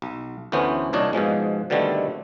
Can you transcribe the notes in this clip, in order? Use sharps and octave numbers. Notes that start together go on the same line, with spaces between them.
B1
D2 E3 A3 B3 C#4 C5
C2 A#2 D4 C#5 D#5
G#2 B2 F3 G#3
B2 D3 D#3 G3 A3 C4